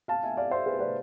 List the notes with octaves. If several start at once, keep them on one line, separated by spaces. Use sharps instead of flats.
F5 A5
E5 G#5
D5 F5
C5 E5
G#4 B4
B4 D5